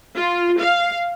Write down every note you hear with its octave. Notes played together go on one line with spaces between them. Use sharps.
F4
F5